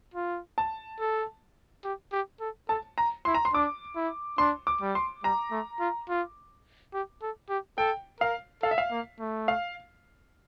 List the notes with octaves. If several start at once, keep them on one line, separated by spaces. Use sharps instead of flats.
F4
A5
A4
G4
G4
A4
A4 A5
A#5
E4 C6
A#5
C6
D4 D6
E4
D4 C6
D6
G3
C6
G3 A#5
A3
F4
F4
G4
A4
G4
A4 G5
A#4 F5
A4 F5
E5
F5
A#3
A3
F5